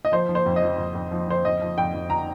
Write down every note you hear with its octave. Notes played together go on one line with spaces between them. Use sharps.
D#5
F3 C5
F3
C5
F2
D#5
F3
F2
F2
F3
F3 C5
F2 D#5
F3
F2 G5
F2
A#5